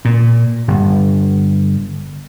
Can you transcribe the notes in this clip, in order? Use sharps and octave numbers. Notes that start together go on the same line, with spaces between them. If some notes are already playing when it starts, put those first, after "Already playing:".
A#2
G1